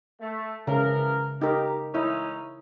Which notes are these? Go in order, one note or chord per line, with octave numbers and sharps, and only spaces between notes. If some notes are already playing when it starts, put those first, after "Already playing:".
A3
C#3 E3 F3 A#4
D#4 G4 A#4
G#3 C#4 D#4 E4